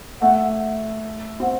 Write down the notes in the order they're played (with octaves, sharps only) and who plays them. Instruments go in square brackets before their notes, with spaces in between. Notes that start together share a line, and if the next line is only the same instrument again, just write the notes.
[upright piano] A3 [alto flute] F#5
[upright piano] C4 [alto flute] F#5